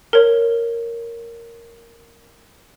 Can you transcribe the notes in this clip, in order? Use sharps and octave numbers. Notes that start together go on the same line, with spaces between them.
A#4 C#5